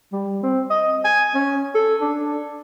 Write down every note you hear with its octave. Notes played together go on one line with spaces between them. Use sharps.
G3
C4
D#5
G#5
C#4
A4
D4